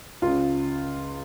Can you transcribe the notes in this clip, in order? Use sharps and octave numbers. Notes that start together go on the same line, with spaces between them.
C#2 C#3 F4